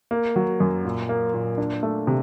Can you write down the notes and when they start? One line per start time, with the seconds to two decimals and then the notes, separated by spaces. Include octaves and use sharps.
0.11 A#3
0.36 F#3
0.60 F#2
0.85 A#2
1.09 A#3
1.34 A#2
1.58 D4
1.83 A3
2.07 C3